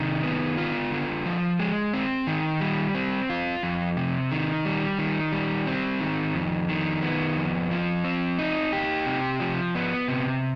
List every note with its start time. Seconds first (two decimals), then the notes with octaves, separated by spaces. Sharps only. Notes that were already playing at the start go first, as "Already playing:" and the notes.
Already playing: C3 D#3
0.23 B3
0.57 F4
0.91 D3
1.25 F3
1.59 G#3
1.94 C4
2.27 D#3
2.60 G3
2.95 C4
3.30 F4
3.63 F2
3.97 C3
4.31 D#3
4.65 G3
4.99 D#3
5.32 G3
5.67 C4
6.00 D#3
6.35 F2
6.69 D#3
7.02 B3
7.37 F2
7.71 F3
8.04 C4
8.39 D#4
8.73 G4
9.06 C3
9.40 F3
9.75 B3
10.08 C3